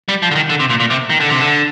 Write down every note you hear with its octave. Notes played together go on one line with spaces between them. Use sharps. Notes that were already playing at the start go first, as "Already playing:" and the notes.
G3
F3
D3
D#3
D3
C3
A#2
A#2
C3
D#3
D3
C3
D3